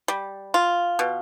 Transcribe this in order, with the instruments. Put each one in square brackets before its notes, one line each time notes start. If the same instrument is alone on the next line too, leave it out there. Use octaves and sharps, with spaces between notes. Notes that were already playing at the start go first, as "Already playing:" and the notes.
[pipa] G3
F4
B2